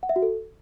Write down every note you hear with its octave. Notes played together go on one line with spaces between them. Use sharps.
F#5
E5
F#4
A4